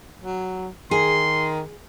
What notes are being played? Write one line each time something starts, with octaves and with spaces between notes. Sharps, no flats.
F#3
D#3 G#4 C6